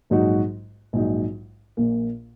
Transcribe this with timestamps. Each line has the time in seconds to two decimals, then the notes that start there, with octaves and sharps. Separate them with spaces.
0.10 A#1 G#2 F#3 D#4 F#4
0.93 A#1 G#2 F#3 D#4 F#4
1.77 A#1 A#2 A#3